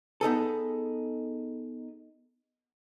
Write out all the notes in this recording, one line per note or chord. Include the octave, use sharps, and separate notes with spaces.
B3 D#4 G#4 A4